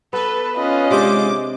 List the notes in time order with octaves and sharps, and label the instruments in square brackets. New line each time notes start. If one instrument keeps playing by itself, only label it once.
[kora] B3 [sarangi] A4 [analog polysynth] B4
[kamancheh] C#4 F4 [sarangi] D#5
[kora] C3 D4 C5 [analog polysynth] G#3 D6